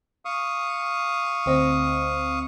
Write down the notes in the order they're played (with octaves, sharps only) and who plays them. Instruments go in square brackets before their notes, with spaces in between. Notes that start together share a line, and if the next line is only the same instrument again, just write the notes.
[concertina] F5 C#6 D#6
[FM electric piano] D2 C4 D#5